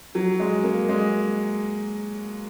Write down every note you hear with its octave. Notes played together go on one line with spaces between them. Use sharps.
F#3
G#3
A#3
G#3